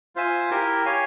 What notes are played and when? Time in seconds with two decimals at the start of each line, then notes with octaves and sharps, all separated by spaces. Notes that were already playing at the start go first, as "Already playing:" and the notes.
0.16 F4 C5 E5 G#5
0.51 E4 G4 A#4
0.85 G4 C#5 F5 G#5